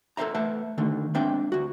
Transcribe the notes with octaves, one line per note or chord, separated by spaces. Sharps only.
A4 B4 C5 E5 A#5
A3 B4 C5 E5 F#5 A5
D3 D#3 A3
G#3 C4 D4 E5 G5
D2 F#4